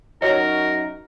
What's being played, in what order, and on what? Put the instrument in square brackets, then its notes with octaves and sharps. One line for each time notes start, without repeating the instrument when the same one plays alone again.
[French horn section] F#2 D#4 F#4 [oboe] A#4 [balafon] C#5 D#5